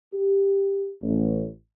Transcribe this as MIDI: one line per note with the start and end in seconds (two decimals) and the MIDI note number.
0.14 0.88 67
1.02 1.46 33